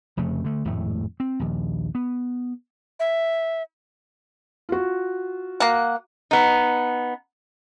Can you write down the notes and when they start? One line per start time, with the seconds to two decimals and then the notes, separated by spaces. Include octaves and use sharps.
0.17 F1 F2 C#3 A3
0.44 D3 A3
0.65 G#1 F2 A2 A3
1.20 C4
1.40 A#1 D#2
1.95 B3
3.00 E5
4.69 F4 F#4
5.60 A#3 F#5
6.31 B3 D#4